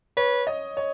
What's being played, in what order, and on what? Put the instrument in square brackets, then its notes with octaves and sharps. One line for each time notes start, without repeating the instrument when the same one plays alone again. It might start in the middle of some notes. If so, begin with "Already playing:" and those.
[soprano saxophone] B4 [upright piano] C#5
[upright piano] D#5
C#5